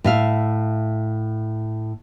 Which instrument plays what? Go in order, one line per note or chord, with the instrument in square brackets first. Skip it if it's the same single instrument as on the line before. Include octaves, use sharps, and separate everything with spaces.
[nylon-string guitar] A2 E5 F5